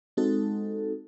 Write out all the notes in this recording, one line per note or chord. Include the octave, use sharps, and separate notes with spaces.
G#3 C4 D#4 F#4 A4